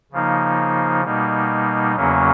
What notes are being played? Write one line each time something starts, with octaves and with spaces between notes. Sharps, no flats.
C#3 F3 A#3 D#4
B2 G3 A#3 D#4
E2 C#3 F#3 A#3 C#4